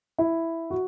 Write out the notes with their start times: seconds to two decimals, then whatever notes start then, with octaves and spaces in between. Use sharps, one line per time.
0.19 E4
0.70 F#4